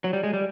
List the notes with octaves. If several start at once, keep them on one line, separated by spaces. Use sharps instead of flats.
F#3
G3
G#3
G3